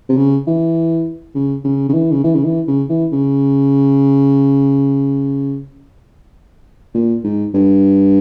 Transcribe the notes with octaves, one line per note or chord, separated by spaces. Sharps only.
C3
C#3
E3
C#3
C#3
C#3
E3
C#3
E3
C#3
E3
C#3
E3
C#3
A#2
G#2
G2